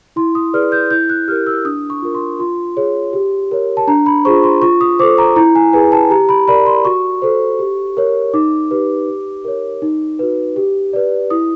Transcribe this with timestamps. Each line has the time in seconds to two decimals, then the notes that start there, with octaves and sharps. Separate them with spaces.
0.16 E4 C6
0.35 D#6
0.53 G#4 B4 D5 F6
0.72 G6
0.91 E4 G6
1.10 F#6
1.28 G4 A#4 F6
1.47 E6
1.65 D4 D#6
1.90 C#6
2.02 F4 A#4
2.15 C6
2.39 F4 C6
2.77 G#4 C#5
3.13 G4
3.51 A#4 C#5
3.77 A5
3.87 D4 A#5
4.06 B5
4.25 F4 G#4 C5 C#6
4.43 C6
4.62 F4 C#6
4.81 D#6
4.99 A4 C5 D6
5.18 A#5
5.36 E4 A#5
5.55 G#5
5.73 G#4 B4 G#5
5.92 A5
6.10 G4 A#5
6.29 B5
6.48 A#4 D5 B5
6.66 C6
6.85 F#4 C#6
7.22 A4 C5
7.59 G4
7.97 A#4 C#5
8.34 D#4 D6
8.71 G4 B4
9.08 G4
9.45 A#4 C#5
9.82 D#4
10.19 F#4 B4
10.56 G4
10.93 B4 D5
11.30 E4 D#6